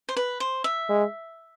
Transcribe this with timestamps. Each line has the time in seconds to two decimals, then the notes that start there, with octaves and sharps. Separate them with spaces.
0.09 C5
0.17 B4
0.40 C5
0.64 E5
0.89 G#3